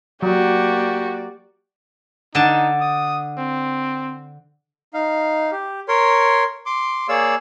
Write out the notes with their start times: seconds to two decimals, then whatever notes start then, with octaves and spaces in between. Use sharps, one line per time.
0.22 F#3 A#3 F#4 G4 D5
2.35 D3 D#4 A5
2.81 D#6
3.38 C4
4.94 D#4 F5
5.52 G4
5.88 A#4 C#5 C6
6.66 C6 D6
7.09 A#3 G#4 C#5 D5 F5 E6